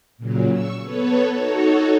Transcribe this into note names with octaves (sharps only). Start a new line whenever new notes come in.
A#2 C#3 F#3
C#6 E6
B3 A4 B4 C#5
D#4 F#4 A4 C#5